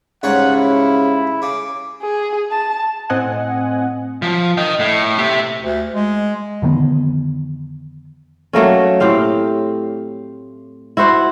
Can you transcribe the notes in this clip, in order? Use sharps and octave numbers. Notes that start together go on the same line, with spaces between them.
G#2 C#3 G3 C#5 F#5
E4
C#3 D6
G#4
A5
A2 C4 D#5 F#5 G#5
F3
D#5 G5
A2
G4 E5
D2
G#3
F2 D3 D#3 B3
F#3 A3 A#3 C#4
A2 C4 G4 F5
E4 F#4 C5 F#5